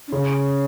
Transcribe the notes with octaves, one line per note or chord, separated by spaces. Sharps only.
D4
C#3 C#4